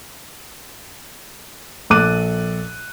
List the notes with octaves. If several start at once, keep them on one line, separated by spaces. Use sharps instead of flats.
A#1 A4 D6 F#6 D#7